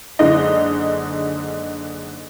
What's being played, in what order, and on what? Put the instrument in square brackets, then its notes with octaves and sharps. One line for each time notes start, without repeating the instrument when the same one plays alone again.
[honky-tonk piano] F#1 D3 G#3 D#4 D#5